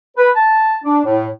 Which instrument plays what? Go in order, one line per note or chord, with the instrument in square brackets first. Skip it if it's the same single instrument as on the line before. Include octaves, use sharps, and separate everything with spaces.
[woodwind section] B4
A5
D4
A2